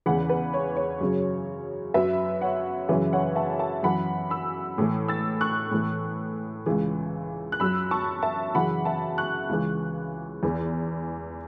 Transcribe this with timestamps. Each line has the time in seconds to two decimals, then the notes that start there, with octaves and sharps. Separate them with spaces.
0.06 E2 C#3 E3 F#5 B5
0.30 B4
0.54 C#5
0.77 C#5
1.01 F#2 C#3 F#3
1.94 F#2 F#3 B4 E5
2.41 C#5 F#5
2.89 F#2 C#3 E3 B4 E5
3.13 C#5 F#5
3.36 E5 A5
3.59 E5 A5
3.83 F#2 E3 F#5 B5
4.30 B5 E6
4.78 A2 E3
5.08 E6 A6
5.41 C#6 F#6
5.71 A2 E3
6.66 C#2 C#3 E3
7.52 F#6
7.60 F#2 F#3 B5 E6
7.91 A5 C#6
8.23 E5 A5
8.55 F#2 C#3 E3 F#5 B5
8.85 E5 A5
9.18 C#6 F#6
9.49 C#2 C#3 E3
10.43 E2 E3